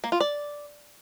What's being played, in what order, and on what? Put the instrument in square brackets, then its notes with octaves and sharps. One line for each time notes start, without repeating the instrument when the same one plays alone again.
[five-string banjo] A#3
F4
D5